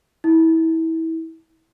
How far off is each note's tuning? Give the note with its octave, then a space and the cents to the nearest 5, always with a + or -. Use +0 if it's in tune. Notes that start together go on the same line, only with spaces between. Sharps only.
E4 -25